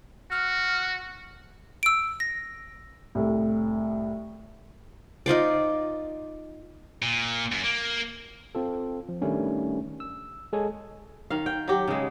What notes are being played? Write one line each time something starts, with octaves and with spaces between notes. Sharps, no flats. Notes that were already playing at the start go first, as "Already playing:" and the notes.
F#4 F6
E6 D7
A#6
C2 A2
D#4 F4 C5 D5
A#2
F#2
A#3
C4 F4 A4
F3
D#3 G3 A3 C#4 D4
E6
G#3 G#4 A4 C#5 G#5
D#3 F5
G5
F#3 G4
C#3 G#3